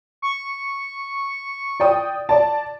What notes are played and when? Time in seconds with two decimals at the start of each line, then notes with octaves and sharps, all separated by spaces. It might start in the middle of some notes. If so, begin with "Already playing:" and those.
0.22 C#6
1.80 D5 G5 D#6
2.29 D5 A5